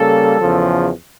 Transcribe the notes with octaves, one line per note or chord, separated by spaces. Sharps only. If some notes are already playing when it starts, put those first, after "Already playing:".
Already playing: C#3 G3 A#3 A4
E2 C#3 F3